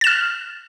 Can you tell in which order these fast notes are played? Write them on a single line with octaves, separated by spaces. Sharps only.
A6 E7 F6